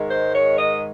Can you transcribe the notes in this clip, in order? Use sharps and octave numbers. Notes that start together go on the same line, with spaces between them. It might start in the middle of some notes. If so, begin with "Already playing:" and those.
Already playing: G#2 D#3 G#3
C5
C#5
D#5